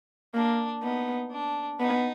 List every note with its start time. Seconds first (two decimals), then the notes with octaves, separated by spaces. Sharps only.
0.34 A#3 D4
0.83 B3 D#4
1.31 D4
1.80 B3 D#4